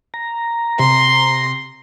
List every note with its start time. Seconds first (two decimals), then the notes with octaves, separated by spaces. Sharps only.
0.14 A#5
0.79 C3 C6